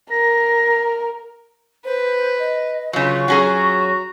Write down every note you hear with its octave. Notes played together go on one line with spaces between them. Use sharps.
A#4 A#6
B4 C5
D#5
C#3 F#3 F4 C#5 C#6
F#3 C#4 F#4 G#4 A#5